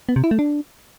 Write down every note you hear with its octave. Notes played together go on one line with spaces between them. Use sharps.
B3
C3
E4
A3
D4